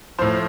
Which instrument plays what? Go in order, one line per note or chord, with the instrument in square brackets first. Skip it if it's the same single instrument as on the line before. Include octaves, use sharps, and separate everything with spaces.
[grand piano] A2 F3 C5